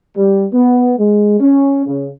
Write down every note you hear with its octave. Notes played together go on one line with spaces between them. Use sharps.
G3
B3
G#3
C#4
C#3